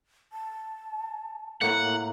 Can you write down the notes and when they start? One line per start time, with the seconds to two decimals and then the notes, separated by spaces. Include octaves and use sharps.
0.32 A5
1.62 A2 A3 A#3 F#5 A#5